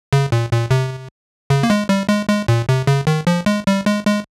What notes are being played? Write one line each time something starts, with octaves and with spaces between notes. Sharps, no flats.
C#3
A#2
A#2
C3
C#3
A#3
G#3
G3
G#3
G#3
A#2
C3
C#3
D#3
F3
G#3
G3
G#3
G#3